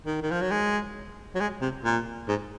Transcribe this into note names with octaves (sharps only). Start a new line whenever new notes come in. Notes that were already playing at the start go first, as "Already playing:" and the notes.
D#3
D#3
F3
F#3
G#3
F#3
G#3
C3
A#2
G#2